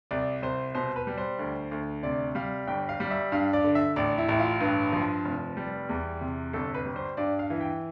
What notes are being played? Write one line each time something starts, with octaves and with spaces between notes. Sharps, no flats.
C2 D5
C2 C5
B2 C5
B4
G3
C5
D2
D2
C3 D5
G3 F5
G1 G5
F5
G3
E5
G2 F5
D5
D3
E5
A1 D5
E4
A1 E4
F4
G2 B4
F3
F1
G3
E2
C3
G1 A4
B4
G3
C5
G2 D5
F5
E3
G5